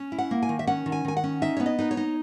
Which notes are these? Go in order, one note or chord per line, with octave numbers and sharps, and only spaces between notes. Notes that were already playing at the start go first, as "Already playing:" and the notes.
Already playing: C#4
E4
F#5
A#3
G#5
D#3
E5
C#4 F#5
D#3
G#5
D#3 G#5
F#5
C#4
D#4 E5
B3 C#5
D#5
D#4 B4
C#5
D#4